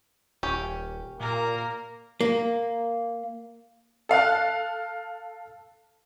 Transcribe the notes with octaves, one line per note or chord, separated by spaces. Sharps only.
D#1 C#4 G4
A#2 A#3 A#4
A#3
A4 F5 A5 F#6